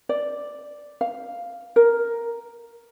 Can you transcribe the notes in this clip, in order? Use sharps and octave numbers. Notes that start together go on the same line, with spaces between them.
D5
F5
A#4